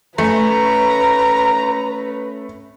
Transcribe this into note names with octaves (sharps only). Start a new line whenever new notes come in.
A3 C#4 B4 A#5